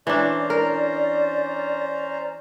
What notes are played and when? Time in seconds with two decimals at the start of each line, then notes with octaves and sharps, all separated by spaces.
0.07 E3 C#4 D4 C5 D5 A#5
0.50 A#4